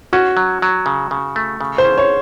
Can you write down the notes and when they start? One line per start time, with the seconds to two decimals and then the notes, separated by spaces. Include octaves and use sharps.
0.13 C#4 F#4
0.37 F#3
0.62 F#3
0.86 C#3
1.11 C#3
1.36 A3
1.61 C#3
1.78 C5
1.85 C#4
1.98 C#5